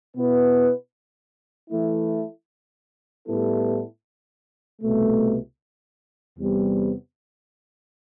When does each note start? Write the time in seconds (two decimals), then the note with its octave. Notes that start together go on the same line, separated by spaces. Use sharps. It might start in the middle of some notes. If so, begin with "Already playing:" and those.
0.16 B2 B3 E4 B4
1.71 E3 A3 E4
3.26 A2 G3 B3 E4 A4
4.82 C2 B2 A3
6.37 E2 C3 G3 B3